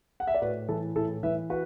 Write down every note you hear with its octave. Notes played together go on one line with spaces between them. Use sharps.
F#5
E5
D5
A2 F#4 B4
E3 E4 A4
A2 E4 A4
E3 B4 E5
F#4 B4